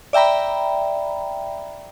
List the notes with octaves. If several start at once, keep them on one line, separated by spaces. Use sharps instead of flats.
D5 E5 G5 A#5 B5